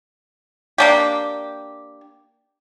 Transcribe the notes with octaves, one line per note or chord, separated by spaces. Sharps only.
A#3 D4 G4